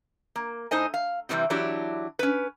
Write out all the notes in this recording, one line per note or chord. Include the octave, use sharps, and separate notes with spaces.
A#3
A2 D#4 C5 D#5 G#5
F5
C3 D#3 E3 G3 C4
E3 F#3 D4 E4 F#4 G4
C#4 B4